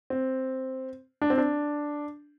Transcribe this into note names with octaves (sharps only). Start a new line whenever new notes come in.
C4
D4
C4
D4